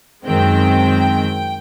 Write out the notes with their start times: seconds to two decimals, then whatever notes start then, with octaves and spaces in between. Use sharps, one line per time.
0.24 F#2 D#3 G#3 C4 G5